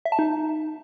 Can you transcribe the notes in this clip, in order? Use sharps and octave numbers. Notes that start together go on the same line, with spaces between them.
E5
A5
D#4